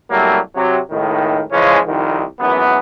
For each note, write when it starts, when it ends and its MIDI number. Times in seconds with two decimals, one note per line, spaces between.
0.10 0.38 36
0.10 0.38 54
0.10 0.38 55
0.10 0.38 57
0.10 0.38 58
0.55 0.78 48
0.55 0.78 54
0.91 1.42 37
0.91 1.42 45
0.91 1.42 51
1.52 1.78 49
1.52 1.78 52
1.52 1.78 53
1.52 1.78 56
1.52 1.78 61
1.87 2.23 36
1.87 2.23 41
1.87 2.23 51
2.39 2.79 32
2.39 2.79 42
2.39 2.79 52
2.39 2.79 59